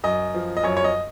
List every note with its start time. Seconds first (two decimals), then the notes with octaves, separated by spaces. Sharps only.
0.04 F#2 D#5
0.34 F3
0.57 D#5
0.63 F#2 C#5
0.77 C#5
0.84 D#5